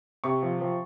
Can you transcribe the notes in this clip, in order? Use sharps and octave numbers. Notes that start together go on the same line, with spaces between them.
C3 C#6
F3
F3